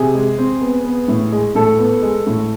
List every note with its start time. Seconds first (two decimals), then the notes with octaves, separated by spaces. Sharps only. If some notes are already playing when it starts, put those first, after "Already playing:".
Already playing: C3 G#4
0.15 G#3
0.38 C4
0.61 B3
0.85 B3
1.08 A2
1.32 G#3
1.55 A2 A4
1.78 B3
2.02 G#3
2.26 A2